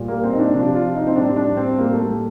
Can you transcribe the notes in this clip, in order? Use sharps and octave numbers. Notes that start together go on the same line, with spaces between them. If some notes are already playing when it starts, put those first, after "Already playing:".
Already playing: A#2 G3
A#3
C4
D#4
D4
C3 F3 D4
F4
D#4
C4
A2 G3 D4
D4
C4
A2 G3 A#3
A3
A3